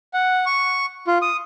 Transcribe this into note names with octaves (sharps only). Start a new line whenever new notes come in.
F#5
C#6
F4
D#6